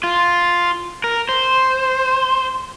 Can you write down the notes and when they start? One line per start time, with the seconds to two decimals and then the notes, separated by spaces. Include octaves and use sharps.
0.03 F4
1.04 A#4
1.29 C5